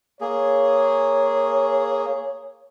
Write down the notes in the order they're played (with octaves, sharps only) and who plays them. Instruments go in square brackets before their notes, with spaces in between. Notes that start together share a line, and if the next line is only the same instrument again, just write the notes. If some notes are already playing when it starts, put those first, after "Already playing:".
[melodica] A#3 G#4 [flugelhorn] C#5